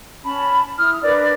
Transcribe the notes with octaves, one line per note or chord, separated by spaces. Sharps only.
C#4 A5 B5
E4 D#6 F6
D4 A#4 B4 D5